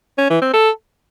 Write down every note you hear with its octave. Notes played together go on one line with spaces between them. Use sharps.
C#4
E3
C4
A4